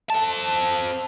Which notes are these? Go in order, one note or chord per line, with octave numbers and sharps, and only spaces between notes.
C4 A5